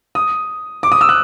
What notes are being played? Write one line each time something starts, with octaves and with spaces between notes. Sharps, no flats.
D#6
D6
D#6
E6
F#6